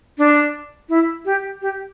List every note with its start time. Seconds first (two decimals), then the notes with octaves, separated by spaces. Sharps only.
0.18 D4
0.89 E4
1.25 G4
1.62 G4